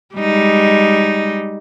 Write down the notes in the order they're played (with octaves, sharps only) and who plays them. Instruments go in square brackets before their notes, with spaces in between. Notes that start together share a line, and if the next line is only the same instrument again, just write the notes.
[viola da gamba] G3 G#3 D#4